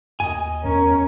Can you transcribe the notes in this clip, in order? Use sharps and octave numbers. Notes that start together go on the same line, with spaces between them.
D#2 D#5 G#5
E2 C#4 A#4